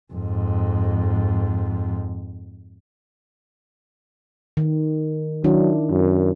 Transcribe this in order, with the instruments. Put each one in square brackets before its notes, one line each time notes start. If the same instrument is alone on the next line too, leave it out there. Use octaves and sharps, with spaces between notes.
[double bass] F2 G#2
[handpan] D#3
[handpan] D#3 D4 E4 [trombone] F#3
[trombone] F#2